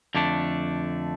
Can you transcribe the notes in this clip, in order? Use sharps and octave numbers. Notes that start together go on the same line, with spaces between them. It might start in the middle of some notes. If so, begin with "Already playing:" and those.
F2 D3 A3 D4